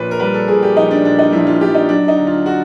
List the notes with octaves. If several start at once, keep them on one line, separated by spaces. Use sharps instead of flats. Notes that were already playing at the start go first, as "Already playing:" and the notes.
Already playing: A#1 A#2 B4 C#5
A#4
G3 B4
A4
A#2 G#4
G4
A#1 D#4
D4
A#2 D4
D#4
A#1 E4
F4
A#1 G4
D#4
F#3 D4
D#4
D2
F4
F#4